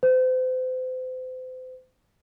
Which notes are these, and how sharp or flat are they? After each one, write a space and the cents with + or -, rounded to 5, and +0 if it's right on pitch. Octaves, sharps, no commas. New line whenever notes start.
C5 -35